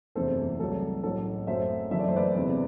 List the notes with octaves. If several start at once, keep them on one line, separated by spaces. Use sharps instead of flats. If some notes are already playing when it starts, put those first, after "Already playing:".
F#1 E2 C3 E3 A3 A4 C5
C2 C3 F#3 A3 A4
A1 A2 F#3 A4
F#2 F#3 A3 C5 E5
F#1 F#2 E3 A3 E5
D5
C5
B4 D5
E1 E2 C3